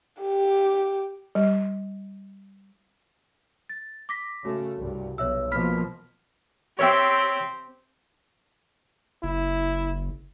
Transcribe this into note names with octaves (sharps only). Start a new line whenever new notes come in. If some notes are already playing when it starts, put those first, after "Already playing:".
G4
G3
A6
D6 A#6 B6
C#3 A3 F#4
C2 G2
B1 C#5 E5 E6
B2 F3 A#3 B5 F6 B6
C4 G4 C#5 E5 G5
F#1 E4